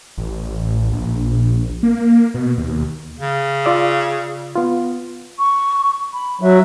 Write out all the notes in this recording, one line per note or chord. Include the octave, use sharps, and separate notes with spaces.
A1
A#1
A#3
B2
D#2
C#3
F4 D5 E6
B3 F4
C#6
B5
F#3 E5